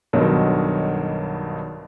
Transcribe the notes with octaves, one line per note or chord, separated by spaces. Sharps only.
B1 G2 B2 D#3 F#3